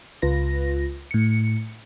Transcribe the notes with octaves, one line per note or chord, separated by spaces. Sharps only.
C#2 F4 B4 A#6
A2 C#7